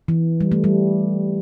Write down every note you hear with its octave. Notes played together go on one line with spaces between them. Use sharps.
E3
G3
A3
G3